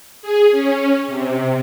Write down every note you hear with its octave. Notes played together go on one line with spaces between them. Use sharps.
G#4
C#4
C3